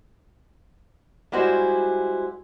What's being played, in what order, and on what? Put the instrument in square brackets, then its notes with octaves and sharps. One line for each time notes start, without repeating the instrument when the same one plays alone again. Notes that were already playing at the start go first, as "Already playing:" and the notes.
[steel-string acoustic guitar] G3 G#3 E4 F#4 G#4 C5